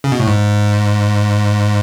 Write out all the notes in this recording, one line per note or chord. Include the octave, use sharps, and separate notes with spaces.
C#3
B2
A2
G#2